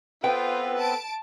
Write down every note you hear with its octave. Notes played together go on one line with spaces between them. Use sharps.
B3 C4 F4 A4 B4 G5
A5 D7